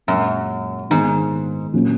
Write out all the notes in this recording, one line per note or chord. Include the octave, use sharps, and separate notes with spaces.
F#2 A#2 G#3 C#4
G#2 D#3 G#3 B3
A#2 F#3 A#3 C#4